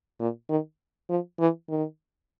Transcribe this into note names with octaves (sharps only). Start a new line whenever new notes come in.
A#2
D#3
F3
E3
D#3